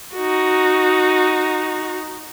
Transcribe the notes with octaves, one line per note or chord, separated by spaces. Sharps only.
D#4 F#4